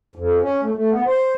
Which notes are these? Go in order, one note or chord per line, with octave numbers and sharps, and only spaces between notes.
F2
C#4
A3
A3
B3
C5